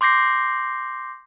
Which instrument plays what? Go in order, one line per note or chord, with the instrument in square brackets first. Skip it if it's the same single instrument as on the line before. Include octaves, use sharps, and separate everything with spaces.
[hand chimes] C6 D6 G6 A#6 C7